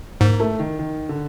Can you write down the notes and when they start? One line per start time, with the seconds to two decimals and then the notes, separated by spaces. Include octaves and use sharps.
0.20 G#2 A#3
0.40 A3
0.59 D#3
0.79 D#3
1.09 D3